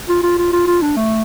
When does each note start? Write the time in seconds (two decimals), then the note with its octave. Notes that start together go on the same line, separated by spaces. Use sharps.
0.09 F4
0.23 F4
0.38 F4
0.53 F4
0.67 F4
0.82 D4
0.96 A3